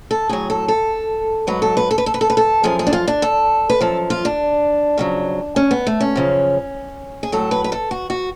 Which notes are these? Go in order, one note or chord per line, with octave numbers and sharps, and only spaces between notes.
A4
A2 F#3 G#4
A4
A4
G#2 F#3 B4
A4
B4
A4
B4
A4
B4
A4
B4
A4
F#2 F3 G#4
G#4
D4
F4
D4
A4
B4
F#2 F3 A4
F4
D4
F2 C#3 F#3
C#4
B3
A3
C#4
F#2 C#3 F3
G#4
A2 F#3 A4
B4
B4
A4
F#4
F#4